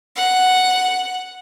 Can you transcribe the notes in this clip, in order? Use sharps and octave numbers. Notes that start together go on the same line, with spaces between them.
F#5